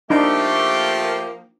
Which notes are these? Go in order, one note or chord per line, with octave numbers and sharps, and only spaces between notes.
F3 A3 A#3 D4 D#4 G4